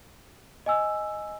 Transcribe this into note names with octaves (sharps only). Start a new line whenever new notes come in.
D#5 G#5 E6